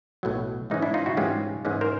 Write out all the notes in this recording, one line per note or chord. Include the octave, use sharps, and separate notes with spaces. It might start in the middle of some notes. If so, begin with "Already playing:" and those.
B1 A2 F#3
G#2 E3 G#3 C#4 D#4
D4 E4
D#4 F4
E4 F#4
G#2 E3 G#3 C#4 F4 G4
G#2 E3 G#3 C#4
A#4 C5